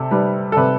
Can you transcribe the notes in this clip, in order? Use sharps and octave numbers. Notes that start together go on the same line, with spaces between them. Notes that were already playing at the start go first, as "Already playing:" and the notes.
Already playing: C3 A4
G3 B4
A4
C3 B4